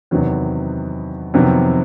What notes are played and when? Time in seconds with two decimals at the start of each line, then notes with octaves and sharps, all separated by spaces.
0.11 E2 C3 D#3 F#3 B3
1.34 F2 C3 D#3 F#3 B3